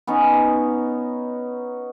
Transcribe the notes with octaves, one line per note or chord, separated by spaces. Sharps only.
B3 C#4 D#4 C#5